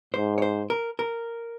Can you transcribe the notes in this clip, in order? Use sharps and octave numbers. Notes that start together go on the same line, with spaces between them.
G#2 C5
C#5
C5
A#4
A#4